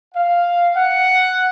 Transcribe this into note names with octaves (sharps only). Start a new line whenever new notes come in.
F5
F#5